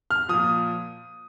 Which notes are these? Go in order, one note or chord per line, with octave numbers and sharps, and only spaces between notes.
F6
A#2 F3 D#6